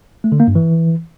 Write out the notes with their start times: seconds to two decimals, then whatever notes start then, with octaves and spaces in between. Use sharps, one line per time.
0.24 A3
0.32 D3
0.40 A#3
0.48 G2
0.55 E3